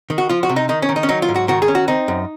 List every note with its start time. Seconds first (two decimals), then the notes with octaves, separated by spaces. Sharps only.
0.10 D#3
0.18 F#4
0.29 F3 F4
0.43 F#4
0.49 C3
0.56 D#4
0.69 D#3 D#4
0.82 C#4
0.89 D#3
0.96 D#4
1.03 C#4
1.09 F#3 D#4
1.22 F4
1.29 G#2
1.36 F#4
1.48 D#3 F#4
1.62 G#4
1.68 C#4
1.75 F#4
1.88 C4 D#4
2.08 F#2